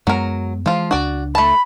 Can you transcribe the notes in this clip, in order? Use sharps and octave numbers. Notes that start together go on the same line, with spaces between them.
F#2 F#3 G#3 B3 A#4
E3 F3 G#3 F4
C#2 D4 F#4 D5
A3 A5 B5